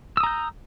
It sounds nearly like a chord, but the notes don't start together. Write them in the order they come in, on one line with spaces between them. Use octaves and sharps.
E6 D#6 A#5 G6